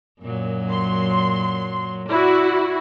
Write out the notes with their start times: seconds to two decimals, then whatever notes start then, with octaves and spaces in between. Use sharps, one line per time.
0.22 F#2 A#2 F#3
0.71 C6
2.10 E4 F#4 D5